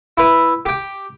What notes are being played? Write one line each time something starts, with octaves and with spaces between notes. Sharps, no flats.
E4 B4
G4 G5